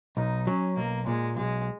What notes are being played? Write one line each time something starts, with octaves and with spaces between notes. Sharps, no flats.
B1 D#4
F#3 C#4
B1 A#3
A#2 G#3
B1 G#3